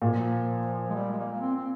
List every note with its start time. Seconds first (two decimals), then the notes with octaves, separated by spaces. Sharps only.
0.02 A#2 F3
0.90 G#3
0.95 G3
1.12 G#3
1.18 A#3
1.32 A#3
1.41 C4
1.56 C4